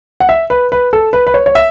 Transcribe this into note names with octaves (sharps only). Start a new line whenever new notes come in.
F#5
E5
B4
B4
A4
B4
B4
C#5
C#5
E5